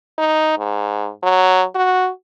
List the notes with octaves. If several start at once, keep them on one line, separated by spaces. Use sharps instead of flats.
D#4
G#2
F#3
F#4